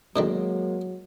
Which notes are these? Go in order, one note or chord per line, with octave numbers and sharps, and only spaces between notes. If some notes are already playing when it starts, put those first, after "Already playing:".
B2 D3 D#3 F#3 G#3 A#3